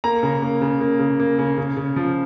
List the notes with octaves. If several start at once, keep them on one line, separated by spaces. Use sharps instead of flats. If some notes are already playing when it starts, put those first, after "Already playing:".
A#3 A#5
C#3
A#3
C#3
A#3
C#3
A#3
C#3
C#3
C#3
F3